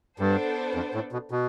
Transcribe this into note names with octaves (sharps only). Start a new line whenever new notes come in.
G2 B3 D4 A4 C5
F2
A2
B2
B2